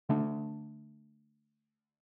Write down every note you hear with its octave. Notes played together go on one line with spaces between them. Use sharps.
D3 A3 D4